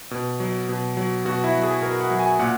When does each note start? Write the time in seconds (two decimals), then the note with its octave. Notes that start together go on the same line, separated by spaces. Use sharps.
0.11 B2
0.40 F#3
0.69 B2
0.97 F#3
1.25 B2 F#4
1.44 E4
1.54 F#3
1.63 G#4
1.82 B2 A#4
2.01 F#5
2.10 F#3
2.20 G#5
2.39 A#2 F#5